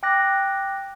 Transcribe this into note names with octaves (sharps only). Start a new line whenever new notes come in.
G5 D6 F#6 A#6